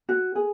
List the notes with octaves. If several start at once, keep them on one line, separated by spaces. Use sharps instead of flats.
F#4
G#4